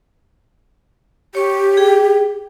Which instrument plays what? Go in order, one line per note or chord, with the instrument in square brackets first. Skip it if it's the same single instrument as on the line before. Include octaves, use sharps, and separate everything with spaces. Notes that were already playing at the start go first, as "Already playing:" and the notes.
[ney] G4 [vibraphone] C#5 C#6
[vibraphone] G#4 G5